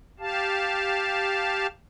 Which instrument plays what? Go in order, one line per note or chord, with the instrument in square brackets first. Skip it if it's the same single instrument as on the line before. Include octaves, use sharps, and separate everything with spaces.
[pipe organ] G4 F5 A5